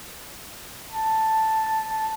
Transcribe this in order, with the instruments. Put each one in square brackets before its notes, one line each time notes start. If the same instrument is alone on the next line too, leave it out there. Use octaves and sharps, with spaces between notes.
[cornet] A5